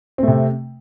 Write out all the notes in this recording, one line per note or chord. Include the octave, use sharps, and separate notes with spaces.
C3 A3 C4